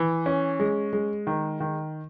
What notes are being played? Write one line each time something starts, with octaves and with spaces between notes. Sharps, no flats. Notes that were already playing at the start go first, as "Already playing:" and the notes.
Already playing: E3
C#4
G#3
G#3
D#3
D#3